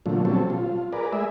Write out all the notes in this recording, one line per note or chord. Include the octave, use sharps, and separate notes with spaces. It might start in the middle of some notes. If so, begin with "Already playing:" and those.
A#2 D3 F3 F#3 A3
B2 F#3 G3 C4 C#4 A4
F4
G#4 A#4 B4 D5
G#3 A3 G#4 E5